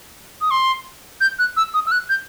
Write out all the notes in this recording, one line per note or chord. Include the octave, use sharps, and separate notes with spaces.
D#6
C6
G6
F#6
E6
D#6
E6
F#6
G6